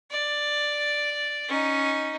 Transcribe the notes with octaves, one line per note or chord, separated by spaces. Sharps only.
D5
C#4 D#4